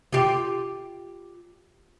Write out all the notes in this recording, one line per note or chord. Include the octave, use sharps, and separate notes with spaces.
F4 G4